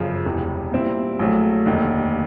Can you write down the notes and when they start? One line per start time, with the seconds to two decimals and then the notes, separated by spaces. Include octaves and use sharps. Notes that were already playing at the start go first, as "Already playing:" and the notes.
Already playing: G1 F#2 C#3 F3
0.25 E1 E2 C3 E3
0.72 A#2 G3 C4 E4
1.19 A#1 A2 F#3 A3
1.66 F1 D#2 D3